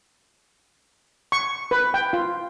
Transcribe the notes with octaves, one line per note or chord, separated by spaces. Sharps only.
C#6
B4
G5
F4